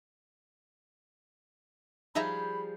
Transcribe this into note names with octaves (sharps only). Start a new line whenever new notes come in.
F3 G3 D#4 G#4 E5 A#5 B5